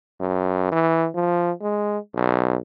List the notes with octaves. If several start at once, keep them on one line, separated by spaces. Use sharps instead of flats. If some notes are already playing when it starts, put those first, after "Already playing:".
F#2
E3
F3
G#3
B1